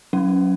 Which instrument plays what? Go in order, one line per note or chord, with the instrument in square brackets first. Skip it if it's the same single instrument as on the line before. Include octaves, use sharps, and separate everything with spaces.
[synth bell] F#3 C#4